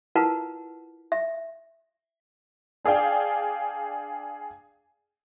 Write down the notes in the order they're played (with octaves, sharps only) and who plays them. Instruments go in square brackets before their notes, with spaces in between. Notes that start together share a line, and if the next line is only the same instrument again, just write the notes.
[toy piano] E4 F4 A#4 B4 F#5 A5
E5
[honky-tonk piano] D4 G#4 D5 F5 G5